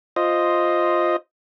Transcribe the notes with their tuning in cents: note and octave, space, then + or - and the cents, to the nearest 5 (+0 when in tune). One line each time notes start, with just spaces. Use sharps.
F4 +0 C5 +0 D#5 +0